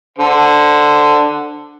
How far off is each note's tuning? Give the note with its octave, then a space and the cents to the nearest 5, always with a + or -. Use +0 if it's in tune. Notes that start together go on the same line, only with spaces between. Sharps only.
D3 +10 C5 +0